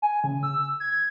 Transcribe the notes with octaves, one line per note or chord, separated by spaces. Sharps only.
G#5
C#3
E6
G#6